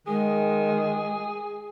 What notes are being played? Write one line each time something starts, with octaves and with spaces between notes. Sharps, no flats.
D#3 G#3 G#4